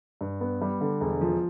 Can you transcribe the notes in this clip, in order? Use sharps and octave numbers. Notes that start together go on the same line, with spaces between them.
G2
B3
G3
D3
E1
F3